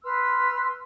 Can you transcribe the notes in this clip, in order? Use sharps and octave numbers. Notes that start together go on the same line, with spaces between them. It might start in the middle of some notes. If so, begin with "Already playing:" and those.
B4 C6 E6 F6